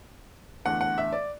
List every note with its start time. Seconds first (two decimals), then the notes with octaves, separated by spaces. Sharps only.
0.65 E2 D3 A3 F#5
0.81 F#5
0.98 E5
1.13 D5